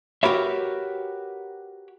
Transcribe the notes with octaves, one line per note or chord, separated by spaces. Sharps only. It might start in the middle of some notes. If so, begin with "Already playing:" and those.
F#4 G4 A#4 B4 C#5 E5